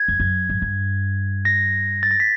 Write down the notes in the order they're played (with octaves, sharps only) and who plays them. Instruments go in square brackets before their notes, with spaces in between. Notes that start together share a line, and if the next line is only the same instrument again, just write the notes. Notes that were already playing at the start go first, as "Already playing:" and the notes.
Already playing: [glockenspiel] G#6
[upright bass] F2
F#2
G#2
G2
[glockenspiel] A#6
A6
A#6
B6